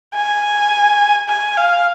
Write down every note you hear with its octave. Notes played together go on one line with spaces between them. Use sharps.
G#5
G#5
F5